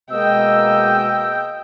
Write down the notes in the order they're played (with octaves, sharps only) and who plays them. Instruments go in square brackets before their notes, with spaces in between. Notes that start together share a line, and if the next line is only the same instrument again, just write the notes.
[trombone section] B2 G#3 A#3 [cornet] D#5 [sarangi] G5 [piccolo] E6